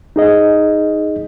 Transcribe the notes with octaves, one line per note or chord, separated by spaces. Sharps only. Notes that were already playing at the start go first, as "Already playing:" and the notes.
D#4 G#4 D#5